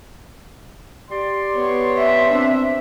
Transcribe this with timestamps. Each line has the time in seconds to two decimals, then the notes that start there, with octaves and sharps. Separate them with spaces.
1.11 G4 D5 C6
1.54 B3 C#5
1.98 E5
2.29 C4 D4